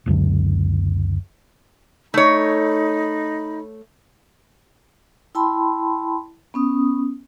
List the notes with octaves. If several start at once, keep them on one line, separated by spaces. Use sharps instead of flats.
F#1 C#2 F#2 D3
A3 D#4 C#5 B5
E4 G5 A5 B5 C6
B3 C#4 D#6